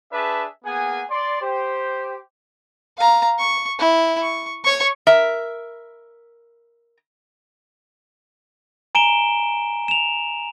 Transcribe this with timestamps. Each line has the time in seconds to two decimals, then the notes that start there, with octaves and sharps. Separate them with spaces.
0.12 D4 G#4 B4 D5 E5 A5
0.64 A#3 B3 G#4 F#5 G#5
1.10 D5 C6
1.41 G4 C5
2.98 F5 A#5
3.38 C#6
3.79 E4
4.21 C#6
4.64 C#5 C#6
5.07 A#4 E5
8.95 G#5 A#5 D7 E7 G7
9.88 E7 F7